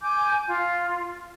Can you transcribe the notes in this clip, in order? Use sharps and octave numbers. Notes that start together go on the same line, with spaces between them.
G#5 D6 G6
F4